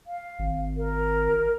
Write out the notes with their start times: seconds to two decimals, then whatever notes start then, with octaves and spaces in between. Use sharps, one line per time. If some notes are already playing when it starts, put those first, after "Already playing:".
0.07 F5
0.39 G#1
0.77 A#4